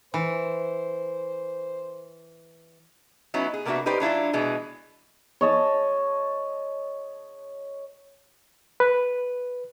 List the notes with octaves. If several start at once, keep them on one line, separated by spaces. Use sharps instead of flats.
E3 C5
F#3 B3 C#4 D#4 E4
G#4
C3 A#3 B3 D4 F#4 E5
D#4 G4 B4 C5 D5
F#3 D4 E4 F4
B2 E3 G#3
C#5 D#5 A5
B4